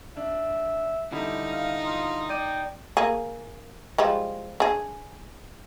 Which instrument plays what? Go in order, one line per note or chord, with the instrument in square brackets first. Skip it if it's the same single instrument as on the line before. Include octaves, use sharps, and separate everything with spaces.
[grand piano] D4 [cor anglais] E5
[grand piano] D3 G3 E4 [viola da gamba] D#4
[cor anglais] F5
F4
[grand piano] D5 D6 D#7 [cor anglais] G5
[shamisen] A#3 G#4
F3 G3 G#3
D4 G#4